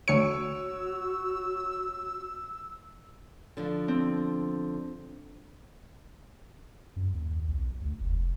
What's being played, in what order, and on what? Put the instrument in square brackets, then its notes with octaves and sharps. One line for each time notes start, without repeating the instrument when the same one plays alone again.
[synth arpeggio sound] D2 C#7 [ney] F#4 [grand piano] C#5 [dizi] E6
[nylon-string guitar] D3 F3 D4
[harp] C4
[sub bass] F#2
D#2
B1
D2
F1